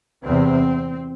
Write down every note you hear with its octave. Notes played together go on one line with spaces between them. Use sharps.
E2 C3 C4